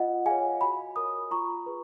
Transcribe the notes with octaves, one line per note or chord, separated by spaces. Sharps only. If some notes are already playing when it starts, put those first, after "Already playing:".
Already playing: F4 D#5 F#5
G#4 C#5 F5 G#5
F#4 G#5 B5
A#4 C#5 B5 D#6
F4 A#5 C#6
G#4 B4